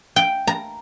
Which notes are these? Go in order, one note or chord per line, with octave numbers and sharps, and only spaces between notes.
G5
A#5